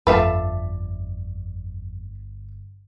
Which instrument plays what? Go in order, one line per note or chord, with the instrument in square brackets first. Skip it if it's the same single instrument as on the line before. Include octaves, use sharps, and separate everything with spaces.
[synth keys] G1 [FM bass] F2 [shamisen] A3 F4 B4 [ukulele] D4 E5 A5